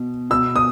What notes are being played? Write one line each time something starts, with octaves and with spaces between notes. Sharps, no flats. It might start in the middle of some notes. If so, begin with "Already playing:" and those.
Already playing: B2
B2 E6
D#6